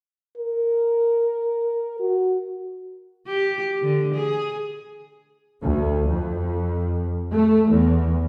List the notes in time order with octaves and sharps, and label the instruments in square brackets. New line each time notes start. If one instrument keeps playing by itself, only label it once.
[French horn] A#4
F#4
[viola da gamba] G4
D3
G#4
[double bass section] D2
F2
A3
E2